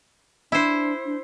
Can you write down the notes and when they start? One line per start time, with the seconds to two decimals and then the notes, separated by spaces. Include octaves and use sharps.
0.52 D4 E4 C5
1.05 D4